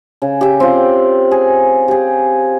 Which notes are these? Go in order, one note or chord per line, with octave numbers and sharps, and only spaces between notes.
C#3
G4 E5
C4 F4
G#4
G4 G#4